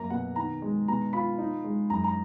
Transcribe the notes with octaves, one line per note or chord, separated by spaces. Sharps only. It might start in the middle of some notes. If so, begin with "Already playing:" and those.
Already playing: F#2 A#3 A#5
B2 F#5
D#3 A#5
G#3
B2 A#5
F4 B5
D#4
G#3
F#2 A#5
A#5